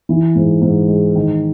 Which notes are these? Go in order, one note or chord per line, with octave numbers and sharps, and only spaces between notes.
E3
G#2
G#2
G#3
D#3